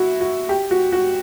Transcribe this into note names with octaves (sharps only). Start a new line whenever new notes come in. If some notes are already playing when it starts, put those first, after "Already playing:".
Already playing: E4 F#4
F#4
G4
F#4
F#4